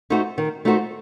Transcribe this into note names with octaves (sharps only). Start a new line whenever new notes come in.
A3 D#4 F#4 C5
D#3
A3 D#4 F#4 C5